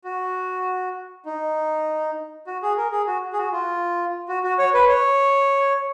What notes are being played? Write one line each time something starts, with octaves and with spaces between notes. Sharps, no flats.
F#4
D#4
F#4
G#4
A#4
G#4
F#4
G#4
F#4
F4
F#4
F#4
C#5
B4
C#5